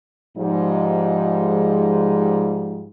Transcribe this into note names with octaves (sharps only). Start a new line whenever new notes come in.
G#2 F3 G3 G#3 D#4